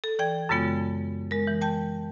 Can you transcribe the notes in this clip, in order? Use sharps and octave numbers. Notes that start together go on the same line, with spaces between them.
A4
E3 D5 G5 G#6
F#2 C#3 G#3 B3 F4
G#3 A#4
E3
G5 A5 G6